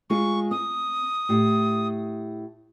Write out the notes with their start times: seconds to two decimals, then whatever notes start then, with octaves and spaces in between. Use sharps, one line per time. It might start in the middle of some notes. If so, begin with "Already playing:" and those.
0.10 G#3 F4 G#4 C#6
0.51 C4 D#6
1.29 A2 G4